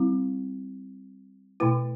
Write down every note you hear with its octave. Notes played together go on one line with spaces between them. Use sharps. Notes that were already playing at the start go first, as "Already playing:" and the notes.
Already playing: G3 C4 E4
B2 A3 E4 B4